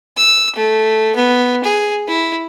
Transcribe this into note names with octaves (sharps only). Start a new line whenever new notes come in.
E6
A3
B3
G#4
E4